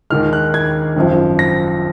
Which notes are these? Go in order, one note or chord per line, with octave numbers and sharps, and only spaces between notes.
D#2 D#3 G#3 F6
F#6
G#6
G#1 F#2 F3
A#6